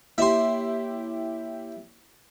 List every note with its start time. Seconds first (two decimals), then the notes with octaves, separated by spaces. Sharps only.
0.18 A#3 E4 G4 C#5 E5 C6